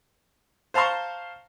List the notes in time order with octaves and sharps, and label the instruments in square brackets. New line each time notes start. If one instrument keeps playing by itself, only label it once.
[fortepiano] C5 F5 A5 A#5 C6 C#6